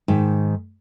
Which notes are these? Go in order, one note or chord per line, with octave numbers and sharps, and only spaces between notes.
G#2 D#3